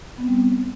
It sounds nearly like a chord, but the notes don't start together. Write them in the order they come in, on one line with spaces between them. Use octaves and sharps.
B3 C4 G3